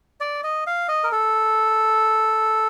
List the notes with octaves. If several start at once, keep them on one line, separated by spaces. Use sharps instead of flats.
D5
D#5
F5
D#5
A#4
A4